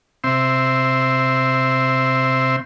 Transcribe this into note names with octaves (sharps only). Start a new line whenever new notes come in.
C3 C4 E5 C6